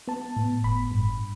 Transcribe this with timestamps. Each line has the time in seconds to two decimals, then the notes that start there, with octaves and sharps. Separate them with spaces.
0.08 B3 A5
0.36 A2
0.64 G1 B5
0.92 G2